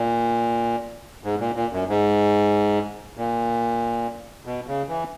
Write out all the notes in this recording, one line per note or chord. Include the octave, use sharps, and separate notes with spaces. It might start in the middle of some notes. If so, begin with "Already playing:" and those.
Already playing: A#2
G#2
A#2
A#2
F#2
G#2
A#2
B2
C#3
E3